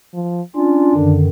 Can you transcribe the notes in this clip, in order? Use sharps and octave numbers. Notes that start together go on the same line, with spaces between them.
F3
C#4 D4 F4
F#2 D3 D#3